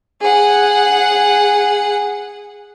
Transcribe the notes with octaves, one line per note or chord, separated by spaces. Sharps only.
G#4 F#5